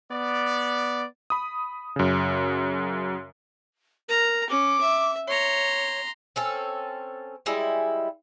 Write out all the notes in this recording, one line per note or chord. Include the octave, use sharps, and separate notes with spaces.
B3 D5
B5 D#6
F#2 C#3
A#4 A#5
C#4 D6
E5
C#5 A#5 C6
C4 C#4 A4
G3 G#3 E4